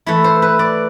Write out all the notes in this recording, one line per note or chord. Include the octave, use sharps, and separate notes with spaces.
E3 A3 E4 E5
C5
B4
D5